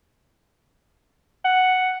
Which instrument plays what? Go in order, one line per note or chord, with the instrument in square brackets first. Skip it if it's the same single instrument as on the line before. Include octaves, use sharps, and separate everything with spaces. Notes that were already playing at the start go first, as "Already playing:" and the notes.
[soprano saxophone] F#5